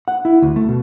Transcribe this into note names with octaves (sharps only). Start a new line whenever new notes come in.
F#5
E4
D2
A3
B2